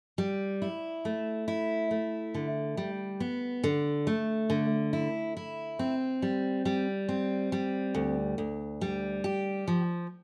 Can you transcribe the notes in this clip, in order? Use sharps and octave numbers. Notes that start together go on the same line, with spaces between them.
G3
E4
A3
E4
A3
D3
G3
B3
D3
A3
D3
E4
E4
C4
G3
G3
C4
G3
D2
D2
G3
G4
F3